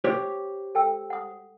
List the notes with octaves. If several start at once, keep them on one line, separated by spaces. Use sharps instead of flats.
G4 C5 C#5
A4 G5 E6
F#5 D#6